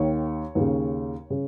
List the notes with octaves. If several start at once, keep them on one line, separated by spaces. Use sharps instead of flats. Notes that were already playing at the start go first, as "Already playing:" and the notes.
Already playing: D#2 D#3 C#5
D#2 C#3
C#3